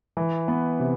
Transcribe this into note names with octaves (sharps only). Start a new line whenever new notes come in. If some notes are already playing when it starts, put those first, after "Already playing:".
E3
B3
C3